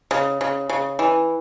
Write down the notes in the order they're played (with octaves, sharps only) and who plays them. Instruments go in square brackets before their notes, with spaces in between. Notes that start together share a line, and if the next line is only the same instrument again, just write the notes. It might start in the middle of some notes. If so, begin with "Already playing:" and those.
[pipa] C#3
C#3
C#3
E3